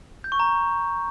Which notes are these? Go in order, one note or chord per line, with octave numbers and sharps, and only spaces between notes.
G6
C#6
A#5